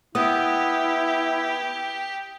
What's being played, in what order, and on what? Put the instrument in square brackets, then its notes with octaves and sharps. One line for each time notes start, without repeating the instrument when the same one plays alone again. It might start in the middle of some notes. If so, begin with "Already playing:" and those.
[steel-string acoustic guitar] B3 [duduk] E4 [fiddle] G4 [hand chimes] D#6